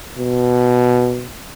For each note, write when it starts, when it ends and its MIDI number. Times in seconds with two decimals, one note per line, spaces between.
0.18 1.29 47